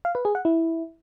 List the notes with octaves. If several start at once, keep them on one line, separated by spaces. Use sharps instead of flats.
F5
B4
G#4
F#5
E4